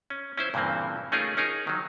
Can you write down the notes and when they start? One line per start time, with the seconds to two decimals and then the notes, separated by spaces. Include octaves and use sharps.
0.10 C#4
0.38 C#4 E4 C5
0.54 G2 A#2 C#3 E3 A#3 C4
1.12 A3 C#4 D#4 F4 G#4 A#4
1.37 C#4 D#4 G#4 A#4
1.67 D#3 F#3